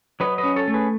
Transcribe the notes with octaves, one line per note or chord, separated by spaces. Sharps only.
F#3 B4 D#5
B4 D#5
C#4
A4 C#5
A3
G#4 B4